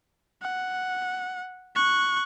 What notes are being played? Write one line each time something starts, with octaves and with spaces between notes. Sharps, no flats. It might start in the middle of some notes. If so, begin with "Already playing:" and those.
F#5
C#6 F#6